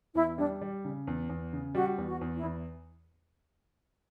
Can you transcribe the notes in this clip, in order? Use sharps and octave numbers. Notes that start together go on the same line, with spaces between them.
E2 E4
G3 D4
G3
C#3
E2
E2
C#3
G3 F#4
E2
F#4
E2
E4
E2